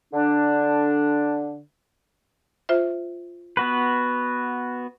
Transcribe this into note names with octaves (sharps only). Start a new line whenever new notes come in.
D3 D4
F4 C5 E5
B3 F#4 B4